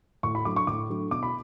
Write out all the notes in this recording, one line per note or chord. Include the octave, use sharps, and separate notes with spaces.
A2 C#6
B5
F#3 A3 D4 D6
C#6
A2 D6
F#3 A3 D4
B2 D6
B5